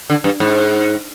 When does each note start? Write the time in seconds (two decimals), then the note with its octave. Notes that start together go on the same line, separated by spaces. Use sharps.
0.10 D3
0.24 G2
0.40 G#2